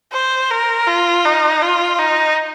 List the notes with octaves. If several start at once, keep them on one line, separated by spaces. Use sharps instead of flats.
C5
A#4
F4
D#4
F4
D#4